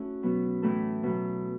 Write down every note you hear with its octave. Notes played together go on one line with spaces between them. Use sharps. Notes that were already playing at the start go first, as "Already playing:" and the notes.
Already playing: A3 C#4 E4 F#4 A4
B2 F#3 B3
A2 E3 A3 E4 A4
B2 F#3 B3